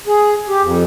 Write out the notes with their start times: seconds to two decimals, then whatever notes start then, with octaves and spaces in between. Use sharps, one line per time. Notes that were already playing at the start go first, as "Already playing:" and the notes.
0.07 G#4
0.49 G4
0.63 F2